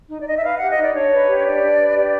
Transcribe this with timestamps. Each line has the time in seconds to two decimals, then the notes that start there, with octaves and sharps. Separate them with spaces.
0.09 D#4
0.20 D5
0.26 D#4 D#5
0.36 E5
0.43 B4 F5
0.56 G4 F#5
0.69 D#5
0.78 D#4 D5
0.94 D4 C#5
1.12 B4
1.28 G4
1.45 D4 D5
1.62 D4
1.79 B4
1.96 G4 D5